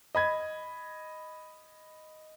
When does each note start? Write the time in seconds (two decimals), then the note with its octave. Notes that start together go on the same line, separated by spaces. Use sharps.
0.15 D#5 B5 G#6